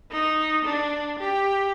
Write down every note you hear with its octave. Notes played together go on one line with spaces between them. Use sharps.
D#4
D4
G4